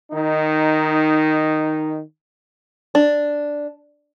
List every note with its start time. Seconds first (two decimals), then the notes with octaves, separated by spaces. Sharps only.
0.12 D#3 D#4
2.95 D4